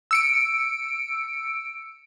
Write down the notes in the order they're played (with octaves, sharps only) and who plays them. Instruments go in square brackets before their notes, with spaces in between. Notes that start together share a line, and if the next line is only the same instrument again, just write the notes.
[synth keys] E6 C#7 D7